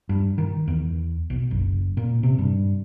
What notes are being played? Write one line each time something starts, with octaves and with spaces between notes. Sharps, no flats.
G2
D#3
E2
B1
F#1
A#2
C3
G2